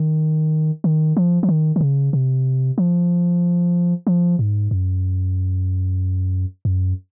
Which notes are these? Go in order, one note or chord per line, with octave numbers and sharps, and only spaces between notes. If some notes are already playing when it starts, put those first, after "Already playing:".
Already playing: D#3
D#3
F3
F3
D#3
D#3
C#3
C3
F3
F3
G#2
F#2
F#2